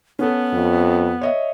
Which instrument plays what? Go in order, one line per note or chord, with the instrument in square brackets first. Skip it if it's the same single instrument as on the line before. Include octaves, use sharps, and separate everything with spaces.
[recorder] B3 [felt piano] C#4 A4
[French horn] F2
[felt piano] C#5 D#5 E5